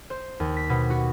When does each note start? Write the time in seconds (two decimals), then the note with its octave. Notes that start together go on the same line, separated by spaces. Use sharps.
0.10 C5
0.40 D#2
0.57 B6
0.69 B2
0.90 F#4